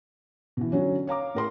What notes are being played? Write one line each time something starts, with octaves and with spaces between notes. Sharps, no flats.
B2 E3
D3 F#3 C#4
C#5 F5 A#5 D6
A2 A#4 C6